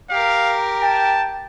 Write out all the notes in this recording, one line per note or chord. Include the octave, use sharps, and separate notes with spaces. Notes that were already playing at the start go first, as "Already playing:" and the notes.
G4 A#4 F5
G5 A5